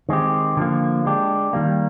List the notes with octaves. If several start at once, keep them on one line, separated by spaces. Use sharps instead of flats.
D#3 G#3 C4 G4
D3 F3 A#3
G#3 D4 G4
D#3 G3 A#3